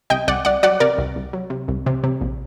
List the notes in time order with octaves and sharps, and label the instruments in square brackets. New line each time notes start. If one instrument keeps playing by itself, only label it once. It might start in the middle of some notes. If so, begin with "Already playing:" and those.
[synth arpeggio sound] C2 D#5 G5
C2 D5 F#5
C2 D5 F#5
F#3 D5 F#5
C3 A#4 D5
C2
C2
F#3
C3
C2
C3
C3
A#1